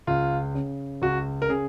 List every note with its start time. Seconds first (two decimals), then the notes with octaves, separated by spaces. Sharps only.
0.07 C#2 F4
0.55 C#3
1.02 C#2 F#4
1.42 A#4
1.49 C#3 G#4